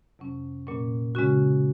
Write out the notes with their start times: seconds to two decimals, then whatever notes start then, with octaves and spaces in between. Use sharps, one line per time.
0.19 F2 C3 F#3 C#4
0.67 A#2 F#3 A#3 C#4
1.15 C#3 G#3 C#4 F#4